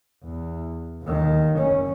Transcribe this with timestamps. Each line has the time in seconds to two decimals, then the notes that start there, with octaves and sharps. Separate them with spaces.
0.23 E2
1.02 D#2 D#3
1.54 F#1 C#4